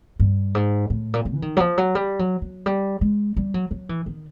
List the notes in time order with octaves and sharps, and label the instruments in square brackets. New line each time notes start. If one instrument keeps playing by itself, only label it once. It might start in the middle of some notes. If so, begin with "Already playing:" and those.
[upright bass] G2
G#2
A2
A#2
A2
E3
D#3
F#3
F3
F#3
G3
F#3
F#3
G3
G#3
G3
F#3
F#3
E3
D#3